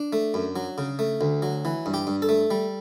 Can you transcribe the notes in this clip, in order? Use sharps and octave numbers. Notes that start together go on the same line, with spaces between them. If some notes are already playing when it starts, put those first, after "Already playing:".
Already playing: D4
A3
F#2
F#3
C#3
A3
D2
F#3
E3
G2
G4
G2
A4
A3
G3